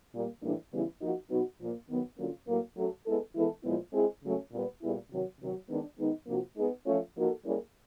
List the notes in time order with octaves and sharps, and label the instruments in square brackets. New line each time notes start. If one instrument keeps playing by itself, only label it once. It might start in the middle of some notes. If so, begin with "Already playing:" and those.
[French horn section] A#2 G3 A#3
A2 E3 G3 A#3 D4
C#3 E3 G3 B3 E4
F3 A#3 D#4 F#4
B2 F#3 B3 D#4 F#4
A#2 F3 A#3
D#3 F#3 B3
D3 F#3 A#3 C#4 F4
A2 F#3 A#3
F#3 A3 C#4 F#4 A4
G#3 B3 E4 A4
E3 G#3 B3 E4 A4
A#2 F3 G#3 B3 E4
G#3 C4 E4 G#4
C#3 F#3 A3 C#4
A#2 G3 B3
A#2 G3 B3 E4 G#4
C3 D#3 F#3
C3 D#3 F#3
D#3 G#3 B3 D4
D#3 G#3 B3 D#4
C3 F3 A#3 D4 F#4
G#3 B3 D#4 G#4
F3 A3 C#4 F4
F3 A#3 D#4 F#4 A4
G3 A#3 C#4 E4 G#4